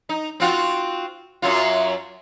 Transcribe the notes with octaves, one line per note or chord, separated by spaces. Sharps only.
D#4
C4 F4 F#4
F#2 F#3 F4